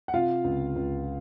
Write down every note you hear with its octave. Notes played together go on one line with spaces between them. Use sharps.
F#5
C3 F4 F5
C#2
C#2